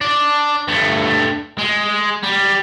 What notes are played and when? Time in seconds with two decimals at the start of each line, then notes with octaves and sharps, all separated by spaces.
0.01 D4
0.68 G2 A3
1.58 G#3
2.23 G3